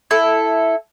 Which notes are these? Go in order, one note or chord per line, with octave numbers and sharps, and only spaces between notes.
E4 A4